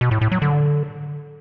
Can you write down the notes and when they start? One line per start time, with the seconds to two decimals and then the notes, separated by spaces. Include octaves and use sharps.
0.01 B2
0.11 A2
0.21 A2
0.32 F#3
0.42 D3